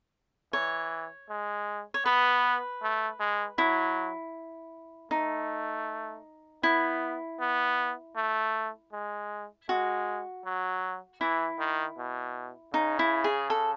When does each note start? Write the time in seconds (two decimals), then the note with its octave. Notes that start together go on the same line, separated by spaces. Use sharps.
0.53 E3 C#5
1.29 G#3
1.94 C#5
2.05 B3 B4
2.82 A3
3.20 G#3
3.58 F#3 E4
5.11 A3 D#4
6.63 B3 E4
7.40 B3
8.16 A3
8.93 G#3
9.69 G#3 F#4
10.45 F#3
11.21 E3 E4
11.59 D#3
11.98 B2
12.74 C#3 D#4
12.99 E4
13.24 G#4
13.50 A4